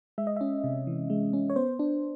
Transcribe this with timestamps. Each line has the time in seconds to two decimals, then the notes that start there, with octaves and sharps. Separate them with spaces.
0.18 G#3 E5
0.27 D#5
0.36 C#4 E5
0.64 C3
0.87 E3
1.10 G#3
1.33 C#4
1.50 C#5
1.56 B3 C5
1.79 D4